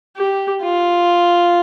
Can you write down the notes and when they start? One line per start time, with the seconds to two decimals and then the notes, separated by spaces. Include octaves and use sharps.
0.17 G4
0.64 F4